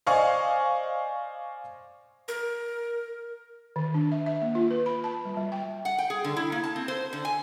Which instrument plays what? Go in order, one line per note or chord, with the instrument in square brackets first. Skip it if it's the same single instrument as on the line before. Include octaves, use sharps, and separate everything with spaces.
[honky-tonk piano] C5 D5 D#5 F5 G#5 C#6
[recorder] A#4
[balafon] D#3
D4
E5
E5
A#3
F4
B4
B5
A5
G3
G3
G5
[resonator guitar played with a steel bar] F#5
G5
G#4
D3
E4
A#3
A5
C4
C5
D3
G#5